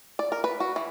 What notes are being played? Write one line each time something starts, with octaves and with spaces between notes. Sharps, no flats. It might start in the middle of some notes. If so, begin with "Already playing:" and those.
D5
A#4
B4
F#4
E3